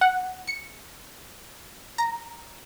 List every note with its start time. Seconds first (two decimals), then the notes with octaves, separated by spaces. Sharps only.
0.01 F#5
0.47 C#7
1.98 A#5